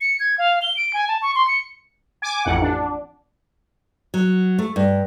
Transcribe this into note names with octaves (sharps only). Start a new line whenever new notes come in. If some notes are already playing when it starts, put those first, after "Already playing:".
C#7
G#6
F5
G7
D7
G#5
A5
C#6
C6
C#7
G#5 D6
A1 F2 F#5
D4
F#3
A3
G2